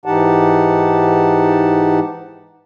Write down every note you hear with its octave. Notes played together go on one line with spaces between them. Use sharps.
G#2 E3 D#4 G4 F#5 A5